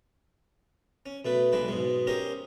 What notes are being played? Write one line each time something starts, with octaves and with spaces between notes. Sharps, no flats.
C#4
B2 A3 B4
B1 G#3 D4 B4
G#2 B2 G#3
C#4 G4 A#4 C5 D#5